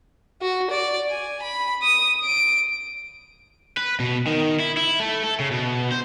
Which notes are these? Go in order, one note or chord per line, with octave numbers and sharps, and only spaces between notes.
F#4
D5
G#5
B5
D#6
D7
B4
B2
D#3
E4
E4
A3
A4
C#3
B2
C5